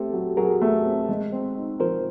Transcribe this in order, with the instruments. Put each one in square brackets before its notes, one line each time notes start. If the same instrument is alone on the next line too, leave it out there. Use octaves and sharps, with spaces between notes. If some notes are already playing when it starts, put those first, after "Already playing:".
Already playing: [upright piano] A3 C4 [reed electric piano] G4 A4
[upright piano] F#3
[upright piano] F#3 [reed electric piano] G#4 A#4
[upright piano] A3
C4
G#3
C4
D#4
[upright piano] F3 [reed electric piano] A#4 C5